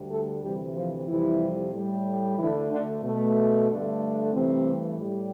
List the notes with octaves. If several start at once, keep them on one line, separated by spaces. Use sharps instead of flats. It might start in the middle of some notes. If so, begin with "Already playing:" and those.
Already playing: D2 D3 G3
A3 A4
D2 C3 E3 G3 G4
F3 F4
F2 C3 E3 G3 E4
A2 G3
D2 D3 E3 A3 E4
D3 D4
B2 A3
G2 D3 A3
G2 C3 E3 A3 C4
A2 G3